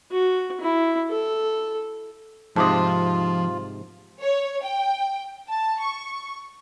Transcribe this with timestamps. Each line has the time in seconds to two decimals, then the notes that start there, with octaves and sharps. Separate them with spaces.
0.12 F#4
0.61 E4
1.10 A4
2.56 G#2 C3 F3 F4 A5 C6 D6 D#6
4.21 C#5
4.64 G5
5.49 A5
5.80 C#6